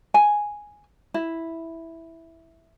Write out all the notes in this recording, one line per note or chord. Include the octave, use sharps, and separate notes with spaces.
G#5
E4